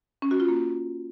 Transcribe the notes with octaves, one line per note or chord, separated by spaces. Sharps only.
C#4
F#4
F4
A#3